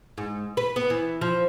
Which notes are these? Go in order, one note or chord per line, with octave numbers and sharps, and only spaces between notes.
G#2
B4
B3
E3
F3